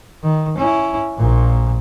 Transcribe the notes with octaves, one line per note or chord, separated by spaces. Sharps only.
D#3
C#4 E4
A#1 A#2